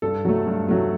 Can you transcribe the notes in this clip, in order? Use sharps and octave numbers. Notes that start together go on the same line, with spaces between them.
G2 A4
F#3 A3
G2
F#3 A3